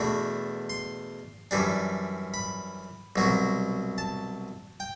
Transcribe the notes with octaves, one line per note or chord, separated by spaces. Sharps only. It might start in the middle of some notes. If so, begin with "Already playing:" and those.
Already playing: E2 B2 A3 D4 B5
C6
F#2 E3 G3 D4
B5
C2 B2 F#3
A5
G5